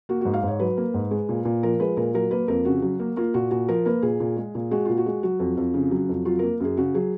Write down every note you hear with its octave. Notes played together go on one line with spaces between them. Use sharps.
A#3 F#4
G#2 F#4
F5
G#2 C#5
F#3 B4
A#3
G#2
G#3
A#2
A#2
F3 A#4
G#3 B4
A#2 A#4
F#3 A#4
A#3 B4
F2 A#4
C#3 F#4
F#3
A#3
A#3 F4
A#2 F#4
A#2 F#4
F3 A#4
A#3 B4
A#2 G#4
A#2
G#3
A#2
G#3 F#4
A#2 F4
F#4
G#3
F#3 F#4
F2
F2
C#3
F#3
F2
F#3 F4
A#3 A#4
F#2 G#4
C#3 F#4
F#3 G#4